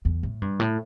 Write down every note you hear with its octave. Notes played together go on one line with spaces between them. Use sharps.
E2
A2
G2
A2